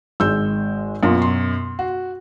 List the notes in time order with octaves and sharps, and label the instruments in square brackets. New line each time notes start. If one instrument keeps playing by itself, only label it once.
[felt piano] G#1 G#3 G6 [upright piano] E6
[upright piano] F#2 B2 [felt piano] A#3 F4
[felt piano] C6
[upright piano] F#4